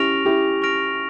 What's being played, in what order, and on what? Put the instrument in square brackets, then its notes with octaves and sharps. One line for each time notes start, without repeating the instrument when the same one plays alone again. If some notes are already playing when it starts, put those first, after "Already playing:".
Already playing: [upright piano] C#4 E4 G4 [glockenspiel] C#6 F6 A#6 D7 F7
[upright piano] E4 G4
[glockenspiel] C#6 F6 A#6 D7 F7